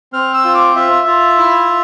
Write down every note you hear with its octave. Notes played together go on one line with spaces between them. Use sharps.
C4 F6
E6
F4
D6
F4 E5
F4
E4